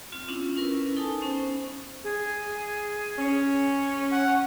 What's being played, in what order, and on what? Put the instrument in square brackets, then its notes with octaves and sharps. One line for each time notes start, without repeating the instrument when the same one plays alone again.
[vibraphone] C4 F4
B3 C#4 D4 E4 F4
C#4 E4 A#4 B4
D#4 A4 G#5 A5
B3 C#4 C5
[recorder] G#4
[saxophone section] C#4
[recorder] F#5